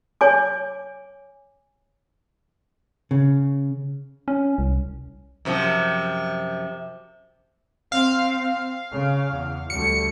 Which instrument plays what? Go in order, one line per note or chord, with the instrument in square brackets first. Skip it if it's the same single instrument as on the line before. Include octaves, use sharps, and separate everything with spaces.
[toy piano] C#5 G#5 D6
[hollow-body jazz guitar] C#3
[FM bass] C#4
C2
[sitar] F#2 C3 F3
[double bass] C4 [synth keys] F5
[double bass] C#3
E2
[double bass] D2 G3 [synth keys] C#7